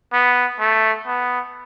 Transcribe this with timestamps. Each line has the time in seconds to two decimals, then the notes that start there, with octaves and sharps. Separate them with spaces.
0.13 B3
0.60 A3
1.07 B3